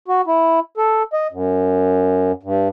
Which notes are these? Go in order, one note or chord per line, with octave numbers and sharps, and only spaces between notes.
F#4
E4
A4
D#5
F#2
G2